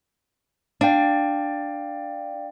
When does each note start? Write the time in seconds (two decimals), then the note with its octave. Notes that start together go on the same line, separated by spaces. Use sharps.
0.81 D4 D5 F5 G5